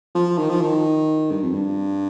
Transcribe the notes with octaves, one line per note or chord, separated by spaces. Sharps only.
F3
D#3
F3
D#3
G2
F2
G2